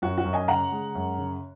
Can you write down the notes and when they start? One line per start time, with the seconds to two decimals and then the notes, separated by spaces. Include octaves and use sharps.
0.02 F#2 F#4
0.18 F#4
0.25 F#2
0.33 D#5 G#5
0.48 C#3 F#5 A#5
0.72 G#3
0.95 F#2
1.18 C#3